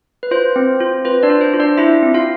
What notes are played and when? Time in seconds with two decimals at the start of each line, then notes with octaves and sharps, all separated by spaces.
0.23 B4
0.31 F4 C5
0.56 C4
0.80 F4
1.05 F4 B4
1.23 D4 D5
1.29 F4
1.41 C5
1.54 F4
1.60 D4 D5
1.77 E4 F4 E5
2.02 C4
2.14 F4 F5